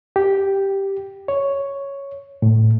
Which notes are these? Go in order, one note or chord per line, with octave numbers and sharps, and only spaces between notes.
G4
C#5
A2